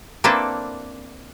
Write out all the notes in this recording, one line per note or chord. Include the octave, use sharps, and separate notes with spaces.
A#3 C4 D4 E4 A4 B4